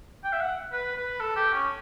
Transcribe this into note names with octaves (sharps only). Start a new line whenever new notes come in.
G5
E5
F#5
B4
B4
A4
G4
C#4